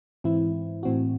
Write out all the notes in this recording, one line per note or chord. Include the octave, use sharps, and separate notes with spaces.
G#2 E3 C4 E4
A2 E3 C4 F#4